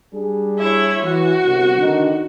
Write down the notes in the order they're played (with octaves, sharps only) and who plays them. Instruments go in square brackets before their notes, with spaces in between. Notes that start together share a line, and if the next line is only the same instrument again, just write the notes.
[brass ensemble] G3 D4 G#4
[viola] E4 C#5
[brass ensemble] E3 [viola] F#4
[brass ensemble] G1 C2
D3 D#3